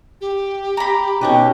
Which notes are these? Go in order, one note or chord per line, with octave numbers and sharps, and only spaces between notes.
G4
A#5 B5
B2 C#4 D#4 G4 B4 G5